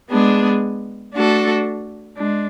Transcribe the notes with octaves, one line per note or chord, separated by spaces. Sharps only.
G#3 B3 D4 G#4
A3 D4 F#4 A4
G#3 D4